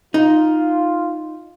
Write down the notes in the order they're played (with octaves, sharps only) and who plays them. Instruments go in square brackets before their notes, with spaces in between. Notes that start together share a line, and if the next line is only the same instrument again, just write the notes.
[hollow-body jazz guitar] D#4 [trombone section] F4